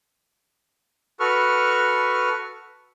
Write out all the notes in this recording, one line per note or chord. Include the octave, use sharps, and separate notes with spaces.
F#4 A4 B4 C#6 F6